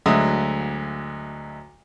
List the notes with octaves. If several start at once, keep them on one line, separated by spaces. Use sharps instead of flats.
D2 F#3 G#3 E5 D#6